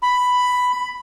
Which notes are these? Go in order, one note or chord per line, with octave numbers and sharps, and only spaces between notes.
B5